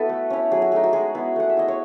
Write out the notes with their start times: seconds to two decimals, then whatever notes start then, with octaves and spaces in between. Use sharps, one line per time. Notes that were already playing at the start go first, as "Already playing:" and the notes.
Already playing: B3 E4 F#4 A4 B4
0.09 A3
0.30 C#4 E4
0.51 F#3 G#4
0.62 F#4
0.72 A3 D#4 G#4
0.83 F#4
0.93 G#3 G#4
1.15 B3 E4
1.36 A3 F#5
1.49 E5
1.57 E4 D#5
1.68 C#5